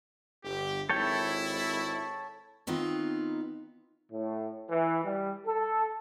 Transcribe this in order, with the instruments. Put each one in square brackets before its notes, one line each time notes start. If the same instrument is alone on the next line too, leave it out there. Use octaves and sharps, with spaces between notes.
[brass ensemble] G1 G4
[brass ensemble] G#1 E4 [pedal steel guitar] A4 C#5 G5
[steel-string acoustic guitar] D#3 B3 C4 D#4 F4
[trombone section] A2
E3
G3
A4